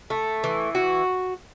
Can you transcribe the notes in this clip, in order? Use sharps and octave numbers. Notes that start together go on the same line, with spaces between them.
A3
E3
F#4